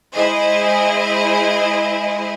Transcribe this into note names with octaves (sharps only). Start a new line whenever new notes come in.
G#3 E4 G#4 C5 D#5